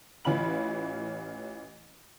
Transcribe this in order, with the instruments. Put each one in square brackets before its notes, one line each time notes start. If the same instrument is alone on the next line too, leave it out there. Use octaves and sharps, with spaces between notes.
[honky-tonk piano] A1 E3 C#4 F4 B5 F#7